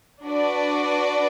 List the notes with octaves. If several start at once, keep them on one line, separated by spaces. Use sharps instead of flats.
D4 F#4 B4 D5